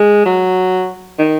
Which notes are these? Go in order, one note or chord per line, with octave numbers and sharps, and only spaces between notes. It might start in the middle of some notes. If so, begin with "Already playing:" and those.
Already playing: G#3
F#3
D#3